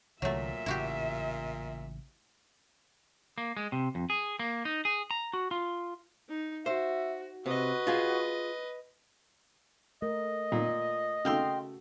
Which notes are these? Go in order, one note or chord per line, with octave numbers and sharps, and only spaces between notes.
C2 A#2 D3 E3 F#3 A3 E5
A1 C#3 E4 F#4 G4
A#3
G#3
C3
F2
G#4
A#3
D#4
G#4
A#5
F#4
F4
D#4
F#4 C5 E5
C3 F#4 B4 D#5
F4 G#4
A3 A#4 D#5
A#2
C#3 A3 F#4 F5 G5 C6 E6